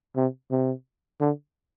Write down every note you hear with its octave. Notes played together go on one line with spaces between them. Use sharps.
C3
C3
D3